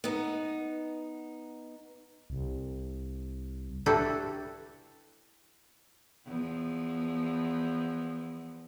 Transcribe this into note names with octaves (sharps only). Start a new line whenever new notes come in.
B3 D#4
C2
D4 E4 F#4 G4 A4 B4
E2 F3